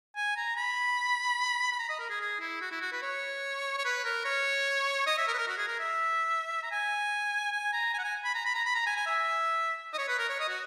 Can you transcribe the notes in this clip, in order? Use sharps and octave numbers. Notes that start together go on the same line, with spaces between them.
G#5
A#5
B5
B5
A#5
D#5
A#4
G#4
G#4
E4
F#4
E4
F#4
B4
C#5
C#5
B4
A#4
C#5
D#5
E5
A#4
B4
A#4
F#4
G#4
A#4
E5
A#5
G#5
G#5
A#5
G#5
F#5
G#5
B5
A#5
B5
A#5
B5
A#5
G#5
G#5
E5
D#5
C#5
B4
A#4
C#5
D#5
F#4